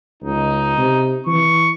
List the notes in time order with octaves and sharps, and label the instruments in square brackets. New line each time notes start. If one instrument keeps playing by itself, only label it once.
[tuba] C#2 [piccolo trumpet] D#4
[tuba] C3
[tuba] E3 [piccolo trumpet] C#6